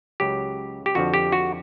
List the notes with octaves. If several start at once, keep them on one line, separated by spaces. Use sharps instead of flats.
C#2 C#3 F#3 G4
G4
F2 D3 F3 F#4
G4
F#4